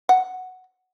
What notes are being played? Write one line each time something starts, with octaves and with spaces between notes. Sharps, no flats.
F#5